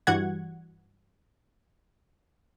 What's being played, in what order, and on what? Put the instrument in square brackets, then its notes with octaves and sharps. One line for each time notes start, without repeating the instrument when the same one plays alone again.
[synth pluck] G2 E3 G3 F#4 F#5 G#6